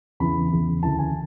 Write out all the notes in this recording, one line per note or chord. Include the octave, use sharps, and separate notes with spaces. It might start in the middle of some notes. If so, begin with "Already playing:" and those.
E2 C#3 E3 B5
E2 C#3 E3
D2 C#3 E3 A5
G#5